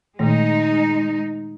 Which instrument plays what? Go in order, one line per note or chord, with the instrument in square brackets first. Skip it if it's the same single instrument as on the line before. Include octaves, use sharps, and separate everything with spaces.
[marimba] A#2 D#3 A3 [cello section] G#3 D#4